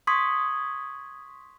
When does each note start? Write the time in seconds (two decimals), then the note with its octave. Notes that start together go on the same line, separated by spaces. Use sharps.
0.07 C6 C#6 D#6 G#6 B6